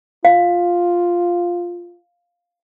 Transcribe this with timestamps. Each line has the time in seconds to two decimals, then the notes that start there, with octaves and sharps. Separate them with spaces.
0.25 F4 F5